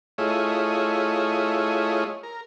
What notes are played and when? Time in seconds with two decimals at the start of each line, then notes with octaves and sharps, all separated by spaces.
0.18 A3 E4 F4 G#4 C#5 D#5
2.23 A#4